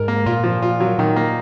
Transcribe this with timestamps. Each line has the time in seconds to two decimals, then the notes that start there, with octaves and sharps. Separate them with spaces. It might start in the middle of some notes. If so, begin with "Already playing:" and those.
Already playing: G#2 A#4
0.08 A#3
0.26 A#2 F4
0.44 F3
0.62 F4
0.80 F#3
0.98 A#2 D#3
1.16 A#3